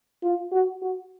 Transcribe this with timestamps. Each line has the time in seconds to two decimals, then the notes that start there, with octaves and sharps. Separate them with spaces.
0.23 F4
0.52 F#4
0.82 F#4